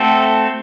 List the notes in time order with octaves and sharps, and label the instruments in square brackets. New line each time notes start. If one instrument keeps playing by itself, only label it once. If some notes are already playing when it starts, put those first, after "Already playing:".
Already playing: [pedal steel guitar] A3 C4 F#4 A4